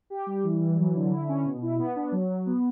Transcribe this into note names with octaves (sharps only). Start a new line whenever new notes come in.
G4
G3
E3
E3
F#3
D3
E4
C#4
B2
E4
B3
D4
F#3
F#3
B3